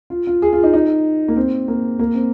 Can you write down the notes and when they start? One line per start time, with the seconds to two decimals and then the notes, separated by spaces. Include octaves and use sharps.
0.10 F4
0.27 F4
0.42 G#4
0.53 F4
0.63 D#4
0.73 D#4
1.28 A#3
1.37 C4
1.68 A#3
1.99 A#3
2.15 C4